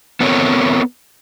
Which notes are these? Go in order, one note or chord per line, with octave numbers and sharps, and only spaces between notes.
B3 C4 A4 A#4 C#5